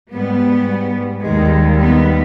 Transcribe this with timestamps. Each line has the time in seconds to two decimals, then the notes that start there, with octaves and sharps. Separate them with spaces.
0.13 G#2 G3 B3
1.23 D#2 D#3 G3 G#3
1.79 B3